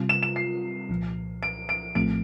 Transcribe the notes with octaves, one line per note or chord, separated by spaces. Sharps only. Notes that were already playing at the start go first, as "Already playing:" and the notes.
Already playing: C3 G3 C4 F4
E7
E7
C7
C2 A#2 F3
D7
D7
A#1 A2 F3 A3 C4 D7